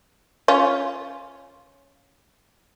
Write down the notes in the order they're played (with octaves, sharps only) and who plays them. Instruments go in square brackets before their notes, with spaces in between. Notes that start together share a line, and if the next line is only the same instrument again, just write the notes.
[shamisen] C#4 F4